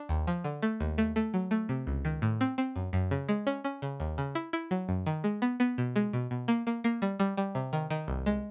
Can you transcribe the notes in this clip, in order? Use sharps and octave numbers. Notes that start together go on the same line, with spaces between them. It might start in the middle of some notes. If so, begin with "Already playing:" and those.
Already playing: D4
D#2
F3
D3
A3
D#2
A3
A3
F#3
A3
C3
C#2
D#3
A2
C4
C4
F#2
F#2
C#3
G#3
C#4
C#4
C#3
D#2
C#3
E4
E4
F#3
F#2
D#3
G#3
B3
B3
B2
G#3
B2
B2
A#3
A#3
A#3
G3
G3
G3
C3
D#3
D#3
C2
G#3